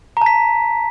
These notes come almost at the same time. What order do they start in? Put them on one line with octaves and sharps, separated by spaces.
A#5 A5 B6